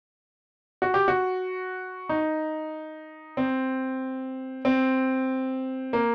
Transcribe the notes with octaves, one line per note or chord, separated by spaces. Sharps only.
F#4
G4
F#4
D#4
C4
C4
A#3